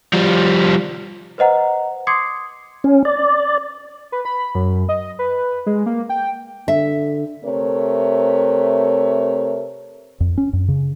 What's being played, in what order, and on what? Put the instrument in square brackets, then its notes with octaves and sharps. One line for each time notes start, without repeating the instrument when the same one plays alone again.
[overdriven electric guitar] F3 G3
[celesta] B4 C5 D#5 F#5 A#5
C6 D6 D#6 G#6 C7 C#7
[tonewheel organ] C#4
D5
[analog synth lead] B4
B5
F#2
D#5
B4
G#3
A#3
G5
[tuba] D3 [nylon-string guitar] E5
[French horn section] C3 A3 A#4 C#5
[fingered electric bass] F2
C#4
F#2
C#3